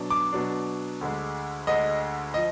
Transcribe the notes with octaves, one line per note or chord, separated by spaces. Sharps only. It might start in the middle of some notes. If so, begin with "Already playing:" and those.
Already playing: B2 F#3 D4
D6
B2 F#3 D4
D2 D3 G#3
D2 D3 G#3 D#5
F3 D#5